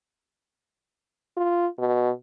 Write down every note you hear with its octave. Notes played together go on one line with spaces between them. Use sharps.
F4
B2